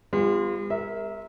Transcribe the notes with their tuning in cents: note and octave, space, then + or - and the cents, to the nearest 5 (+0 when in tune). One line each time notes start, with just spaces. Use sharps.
G#3 -45 B3 +25 F4 +0
A#4 +0 E5 -20